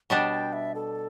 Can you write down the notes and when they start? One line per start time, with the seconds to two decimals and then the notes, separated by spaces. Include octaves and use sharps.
0.10 B2 G3 D4 G5
0.31 G5
0.53 E5
0.75 A4